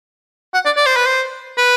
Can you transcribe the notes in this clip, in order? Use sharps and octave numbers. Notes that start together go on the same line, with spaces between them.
F#5
D5
D5
C5
B4
C5
B4